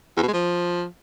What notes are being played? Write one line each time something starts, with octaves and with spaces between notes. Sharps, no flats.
E2
B2
G#3
F3